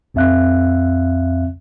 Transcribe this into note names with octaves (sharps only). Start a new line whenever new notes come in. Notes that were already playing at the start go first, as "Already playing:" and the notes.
A#1 F2 C4 E5 F5 F#6